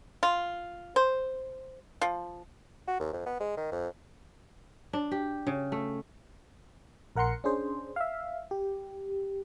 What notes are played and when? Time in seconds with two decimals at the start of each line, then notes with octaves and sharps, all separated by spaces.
0.23 F4
0.96 C5
2.01 F3
2.88 F#4
3.00 D#2
3.13 F2
3.26 B3
3.40 G#3
3.57 D#3
3.72 F2
4.93 D4
5.11 G4
5.47 C#3
5.72 A3
7.16 A#1 A#4 F#5 A#5 C6 C#7
7.44 C#4 D4 G#4 C5
7.96 E5 F5
8.51 G4